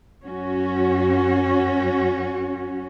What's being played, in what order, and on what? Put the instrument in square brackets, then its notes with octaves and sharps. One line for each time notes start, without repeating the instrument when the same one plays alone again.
[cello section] F#2 C#4 F#4